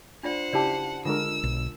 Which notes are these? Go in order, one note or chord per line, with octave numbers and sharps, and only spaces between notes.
D4 F4 C5 D5 F#5
C#3 E4 G4 D5 A5
D3 G#3 F4 A#4 E6
B1